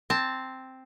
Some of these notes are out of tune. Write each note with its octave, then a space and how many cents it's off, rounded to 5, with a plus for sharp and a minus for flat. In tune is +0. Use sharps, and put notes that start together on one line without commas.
C4 +0 A5 +0